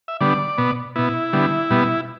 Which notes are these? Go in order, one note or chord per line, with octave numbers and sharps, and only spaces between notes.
E5
D3 G3 B3 D5
B2 B3
B2 B3 E4
D3 G3 B3
B2 G3 B3